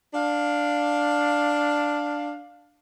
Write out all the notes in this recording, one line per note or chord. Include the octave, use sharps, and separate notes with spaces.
D4 F5